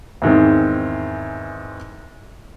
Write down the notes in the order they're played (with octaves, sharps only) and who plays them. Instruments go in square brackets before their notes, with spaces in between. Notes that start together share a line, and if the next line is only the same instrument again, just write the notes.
[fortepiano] E2 G#2 D#3 C4